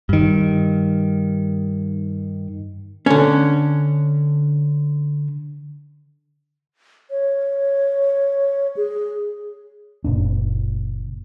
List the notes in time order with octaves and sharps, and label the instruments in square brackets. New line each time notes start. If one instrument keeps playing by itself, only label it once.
[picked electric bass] G2 D#3
[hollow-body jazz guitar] D3 C#4
[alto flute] C#5
G#4
[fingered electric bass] F#1 A#2 D4